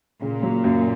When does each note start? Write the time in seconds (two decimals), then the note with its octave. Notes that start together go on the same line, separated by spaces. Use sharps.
0.22 A#2 C#3
0.43 F#3
0.64 F#2